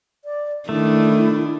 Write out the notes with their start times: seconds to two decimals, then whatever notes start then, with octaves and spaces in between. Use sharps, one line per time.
0.25 D5
0.69 D#3 A3 D4 E4